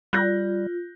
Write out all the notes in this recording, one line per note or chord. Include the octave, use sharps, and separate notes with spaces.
G3 F4 F#6 G6 A#6